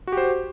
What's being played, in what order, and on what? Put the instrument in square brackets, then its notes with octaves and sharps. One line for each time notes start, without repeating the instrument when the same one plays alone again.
[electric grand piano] F#4
G4
C5